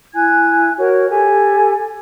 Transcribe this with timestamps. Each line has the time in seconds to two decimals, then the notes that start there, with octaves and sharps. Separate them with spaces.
0.15 E4 G#5 F#6 G#6
0.78 F#4 A#4 C#5
1.10 G4 A4 G#5